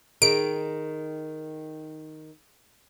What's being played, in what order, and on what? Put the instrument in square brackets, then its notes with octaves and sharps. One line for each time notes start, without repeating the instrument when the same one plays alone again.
[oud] D#3 [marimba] G#4 [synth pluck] D7